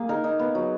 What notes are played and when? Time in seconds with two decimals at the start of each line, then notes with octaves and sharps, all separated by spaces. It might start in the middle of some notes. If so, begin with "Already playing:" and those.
Already playing: A#3 G#4
0.09 D#4 A#4
0.24 D#4
0.39 B3
0.55 F#3